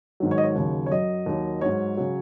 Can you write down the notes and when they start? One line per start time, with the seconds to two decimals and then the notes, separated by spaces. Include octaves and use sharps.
0.20 G#2 D#3 F#3
0.31 C#5
0.38 D#5
0.44 C#5
0.56 D#2 C#3 F#3
0.86 C#5
0.91 F#2 F#3 D#5
1.26 D#2 D#3 F#3
1.61 G#2 F#3 C#5
1.97 C#3 F#3